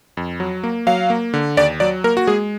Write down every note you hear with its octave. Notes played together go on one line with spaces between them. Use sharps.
F2
F#3
A#3
F#3 F5
A#3
D3
D#2 D5
F#3 D5
A#3 A#4
F#4
G#3 G#4